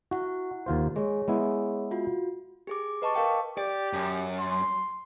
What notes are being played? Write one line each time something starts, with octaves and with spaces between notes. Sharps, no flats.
E4 F#4 F#5
D#2 F4 C5
G#3 G#4 C#5
G#3 B3 E4
F4 F#4
G4 G#4 D6
B4 D#5 A5 C#6 D6
A#4 F5 G5 C#6
G4 D5
F#2
C6